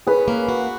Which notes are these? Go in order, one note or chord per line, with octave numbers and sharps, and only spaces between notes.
C#4 G#4 B4
A#3
F#4